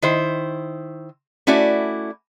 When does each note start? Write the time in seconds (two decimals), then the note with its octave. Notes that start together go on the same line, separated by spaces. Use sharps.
0.02 D#3 E4 C5
1.47 A3 C#4 E4 F#4 D5